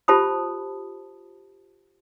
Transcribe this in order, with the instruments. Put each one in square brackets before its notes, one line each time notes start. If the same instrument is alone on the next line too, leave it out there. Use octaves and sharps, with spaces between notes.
[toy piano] F4 G4 C5 A5 B5 D#6